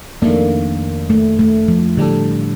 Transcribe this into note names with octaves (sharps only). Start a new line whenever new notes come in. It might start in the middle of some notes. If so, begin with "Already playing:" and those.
F2 D#3 A3 A#3 D4
A3
A3
F3
A2 D3 G3 D4 A4